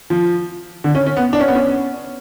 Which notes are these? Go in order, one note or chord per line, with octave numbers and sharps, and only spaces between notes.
F3
D3
C#4
C#4
B3
D4
C#4
B3
C#4